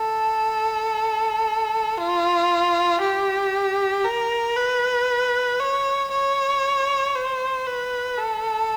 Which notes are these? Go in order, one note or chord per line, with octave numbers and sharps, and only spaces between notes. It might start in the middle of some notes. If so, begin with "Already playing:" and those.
Already playing: A4
F4
G4
A#4
B4
C#5
C#5
C5
B4
A4